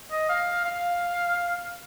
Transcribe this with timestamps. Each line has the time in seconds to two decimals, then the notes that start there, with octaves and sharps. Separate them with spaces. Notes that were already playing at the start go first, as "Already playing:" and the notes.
0.11 D#5
0.29 F5
0.65 F5